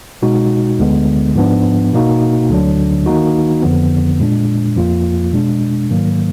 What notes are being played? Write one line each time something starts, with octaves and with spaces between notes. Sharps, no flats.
B2 G#3 D#4 F#4
D2 D3 G#3 B3
G#2 F3 B3 D4
B2 A#3 D#4 F#4
D2 D3 F#3 D4
D#3 A#3 D#4 F#4
F2 D3 F3 B3
A#2 G#3 D4
F2 F3 A#3 F4
B2 G#3 D4
G#2 D#3 F#3 A#3